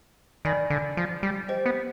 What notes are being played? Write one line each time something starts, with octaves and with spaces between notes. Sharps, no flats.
D#3 D5 G#5 B5
D3
F3
G3
G4 C5 D#5 G5
B3